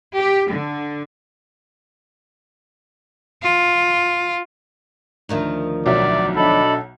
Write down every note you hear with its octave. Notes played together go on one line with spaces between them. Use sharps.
G4
D3
F4
D2 D#3 F3
B1 F#3 D5 E5
D4 A4 D#5 B5